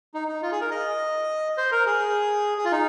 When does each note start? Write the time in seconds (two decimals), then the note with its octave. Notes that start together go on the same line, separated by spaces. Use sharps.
0.14 D#4
0.28 D#4
0.42 F4
0.52 G#4
0.61 A#4
0.71 D#5
1.58 C5
1.72 A#4
1.86 G#4
2.58 G#4
2.65 F4
2.72 D#4